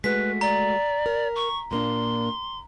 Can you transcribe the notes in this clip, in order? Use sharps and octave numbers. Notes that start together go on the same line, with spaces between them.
G#3 A3 F#4 B4 B6
D5 A#5
A#4
C#6
A#2 A#3 D4 C6